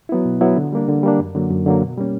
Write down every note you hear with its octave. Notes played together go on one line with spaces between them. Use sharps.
F#3 B3 E4
B2
F#3 B3 E4
D3
G3 A#3 D4
D3
G3 A#3 D4
F#2
D3 F#3 A#3
F#2
D3 F#3 A#3
B2
G3 A#3 C#4